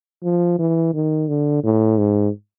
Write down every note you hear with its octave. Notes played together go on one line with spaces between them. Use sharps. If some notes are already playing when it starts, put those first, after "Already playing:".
F3
E3
D#3
D3
A2
G#2